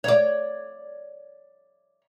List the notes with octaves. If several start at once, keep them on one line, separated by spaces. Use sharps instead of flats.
C#5 D5